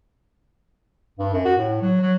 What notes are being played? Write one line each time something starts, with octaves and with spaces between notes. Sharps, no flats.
G2
F#2
F#4
A2
F#3
F#3